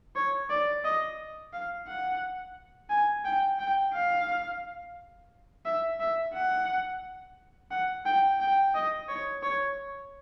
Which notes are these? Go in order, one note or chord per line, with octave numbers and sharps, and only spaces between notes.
C#5
D5
D#5
F5
F#5
G#5
G5
G5
F5
E5
E5
F#5
F#5
G5
G5
D#5
C#5
C#5